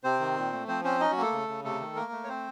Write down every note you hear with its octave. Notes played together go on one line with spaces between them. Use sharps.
C3 C4 C5
D#3
A#2
A3
F3 C4 C5
C4 C#4 C5
C#4 D#4 D#5
F#3 F#4
A3 A#3 A4
C#3
C#3
C3 A3 A4
D#3
A3 A#3 A#4
A3
C#5
C4 C5